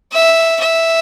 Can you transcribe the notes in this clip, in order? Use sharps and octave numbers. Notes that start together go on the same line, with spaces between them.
E5
E5